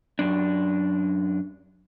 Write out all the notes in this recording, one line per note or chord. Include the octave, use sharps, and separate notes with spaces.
F#2 D4